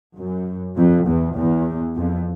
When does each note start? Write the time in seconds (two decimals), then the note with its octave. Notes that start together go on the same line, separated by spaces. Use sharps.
0.16 F#2
0.77 F2
1.07 E2
1.36 E2
1.97 F2